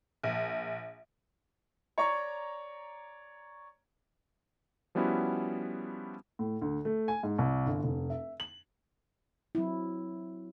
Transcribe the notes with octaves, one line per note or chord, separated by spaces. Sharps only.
A#1
C#5 D5 A#5 C#6
F3 G3 B3 C#4 E4 F#4
A2
D2
A3
G#5
G#2
C2
G1
F1
E5
F#7
F#3 C4 E4